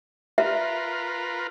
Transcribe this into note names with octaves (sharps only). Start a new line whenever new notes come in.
F4 A#4 B4 E5